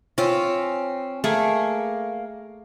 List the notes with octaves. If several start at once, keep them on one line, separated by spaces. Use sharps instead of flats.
C4 C#4 F4
A3 A#3 G#4